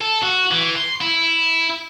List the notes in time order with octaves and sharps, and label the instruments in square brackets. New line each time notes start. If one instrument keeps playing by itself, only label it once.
[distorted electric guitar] A4
F#4
E3
C6
E4